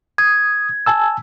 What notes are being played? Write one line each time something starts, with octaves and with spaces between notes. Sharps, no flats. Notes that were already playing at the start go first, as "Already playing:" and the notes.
D#6 G#6
G#5 A5 E6